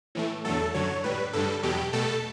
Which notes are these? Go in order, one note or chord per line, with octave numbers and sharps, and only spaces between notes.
A2 E3 A3
E2 D3 F#3 A3 A4
F#2 D3 F#3 C#5
A2 G3 B4
G2 D3 G3 A4
E2 B2 F#3 G4
B2 A3 A4